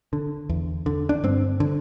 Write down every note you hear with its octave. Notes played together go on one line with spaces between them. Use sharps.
D3
E2
D3
D4
G2 C4
D3